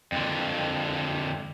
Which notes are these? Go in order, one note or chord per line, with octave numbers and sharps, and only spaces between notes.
F2 D3